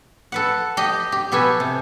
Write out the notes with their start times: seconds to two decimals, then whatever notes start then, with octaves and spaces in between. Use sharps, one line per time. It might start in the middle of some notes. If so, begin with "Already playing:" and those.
0.32 A4 B4 F#5
0.77 G4 D#5
1.12 G4
1.32 B2 G4 A4 B4 G#5
1.60 C3